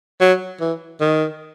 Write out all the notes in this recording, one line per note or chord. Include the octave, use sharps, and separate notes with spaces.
F#3
E3
D#3